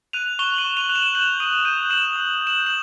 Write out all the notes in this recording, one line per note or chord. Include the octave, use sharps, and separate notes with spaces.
F#6 D#7 F7
C#6 F7 G7
F#7
D#7 F7
C#6
D#7 F7
F#6
E7 F#7
G6 E7 F#7
D#6 D#7 F7
G6 D#7 F7
F7
D#6 E7 F#7
D#6
G6
E7 F#7
D#6 E7 F#7